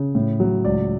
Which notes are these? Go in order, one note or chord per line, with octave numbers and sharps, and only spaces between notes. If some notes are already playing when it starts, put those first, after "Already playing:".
Already playing: C#3
A2
F#3
C#2 D5